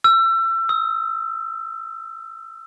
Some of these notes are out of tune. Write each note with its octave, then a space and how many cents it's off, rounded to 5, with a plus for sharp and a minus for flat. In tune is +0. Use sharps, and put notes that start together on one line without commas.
E6 +30
E6 -40